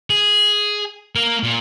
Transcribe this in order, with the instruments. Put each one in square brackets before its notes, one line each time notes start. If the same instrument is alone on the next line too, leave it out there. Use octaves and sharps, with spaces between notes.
[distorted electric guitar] G#4
A#3 A#4
A#2